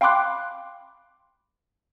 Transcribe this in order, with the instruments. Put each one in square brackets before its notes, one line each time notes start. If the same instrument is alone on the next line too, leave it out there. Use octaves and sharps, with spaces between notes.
[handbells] F5 G5 B5 C6 D6 F#6